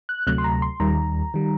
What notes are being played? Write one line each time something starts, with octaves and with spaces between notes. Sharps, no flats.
F#6
D2 C3 F#3 A3 F#6
C6
A#5
C6
D#2 D#3 G3 A#5
D#3 G3